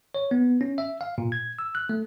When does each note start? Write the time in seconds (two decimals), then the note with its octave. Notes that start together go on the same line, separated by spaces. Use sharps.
0.15 C#5
0.31 B3
0.61 C#4
0.78 E5
1.01 F5
1.18 A#2
1.32 G#6
1.59 E6
1.75 F#6
1.89 A3